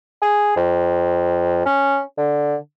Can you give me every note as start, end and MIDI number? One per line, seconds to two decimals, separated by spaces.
0.22 0.53 68
0.56 1.64 41
1.66 2.01 61
2.17 2.55 50